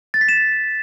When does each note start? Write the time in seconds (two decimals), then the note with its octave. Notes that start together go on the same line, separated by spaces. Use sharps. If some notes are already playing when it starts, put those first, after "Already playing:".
0.14 A6
0.21 B6
0.29 E7